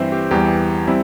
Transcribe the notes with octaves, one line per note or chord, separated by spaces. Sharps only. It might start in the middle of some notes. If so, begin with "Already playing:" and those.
Already playing: G2 E3 C4 C5 E5
G4
E2 E3 G3 G4
G3 C4 E4